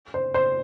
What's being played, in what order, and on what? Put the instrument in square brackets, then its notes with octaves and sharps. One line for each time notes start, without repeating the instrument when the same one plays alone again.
[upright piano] C5
C5